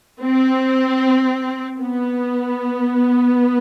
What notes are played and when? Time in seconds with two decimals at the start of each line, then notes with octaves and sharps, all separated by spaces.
0.21 C4
1.80 B3